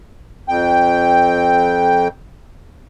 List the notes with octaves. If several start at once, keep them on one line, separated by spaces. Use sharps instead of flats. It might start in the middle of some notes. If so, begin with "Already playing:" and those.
F2 G5